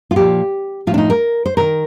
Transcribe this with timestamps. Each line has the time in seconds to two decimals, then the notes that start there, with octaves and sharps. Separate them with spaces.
0.11 F4
0.16 A#2 F3 G4
0.87 A2 F3 F4
0.94 D4
0.98 D#4
1.10 A#4
1.46 C5
1.57 C3 D#3 A#4